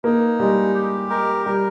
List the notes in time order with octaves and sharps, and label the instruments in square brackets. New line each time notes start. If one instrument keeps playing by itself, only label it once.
[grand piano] A#3 [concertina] D#4
[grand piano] G3 [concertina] G#3
[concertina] G4
A#4
[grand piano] G3 [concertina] A#4